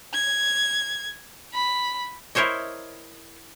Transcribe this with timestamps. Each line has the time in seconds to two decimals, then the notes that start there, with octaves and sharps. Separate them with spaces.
0.14 G#6
1.53 B5
2.35 E4 A#4 C5 C#5 D#5